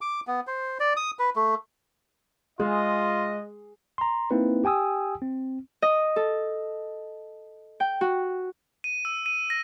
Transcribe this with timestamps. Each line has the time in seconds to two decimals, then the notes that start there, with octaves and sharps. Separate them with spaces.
0.01 D6
0.27 B3
0.47 C5
0.80 D5
0.97 D#6
1.19 B4
1.36 A3
2.60 G#3 F4 G#4 D#5
3.98 A#5 C6
4.31 A#3 C4 D#4 E4 B4
4.64 G4 G5 G#5 D#6 E6
5.22 C4
5.82 D#5
6.16 A4
7.80 G5
8.01 F#4
8.84 D#7
9.05 E6
9.26 D#7
9.50 A#6